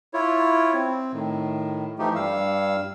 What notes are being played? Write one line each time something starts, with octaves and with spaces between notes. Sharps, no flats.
E4 F4 C#5
C4
A2 D#3
E3 F3 A3 D#4 G4
G2 G3 F5 E6